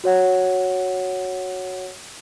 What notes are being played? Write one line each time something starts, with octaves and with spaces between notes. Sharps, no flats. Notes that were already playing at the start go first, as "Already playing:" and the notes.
F#4 C#5 F#5